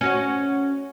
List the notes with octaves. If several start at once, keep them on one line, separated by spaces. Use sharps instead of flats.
C#4 F#4 C#5